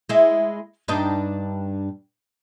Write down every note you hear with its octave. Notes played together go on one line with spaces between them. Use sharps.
G#3 E4
G2 D4 D#4